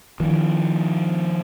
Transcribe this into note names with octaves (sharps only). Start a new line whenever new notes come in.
D#3 F3